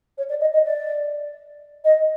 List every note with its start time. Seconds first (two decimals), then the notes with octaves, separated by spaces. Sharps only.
0.18 C#5
0.29 D5
0.41 D#5
0.53 D#5
0.65 D5
1.84 D#5